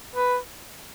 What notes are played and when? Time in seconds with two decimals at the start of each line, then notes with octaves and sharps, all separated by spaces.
0.15 B4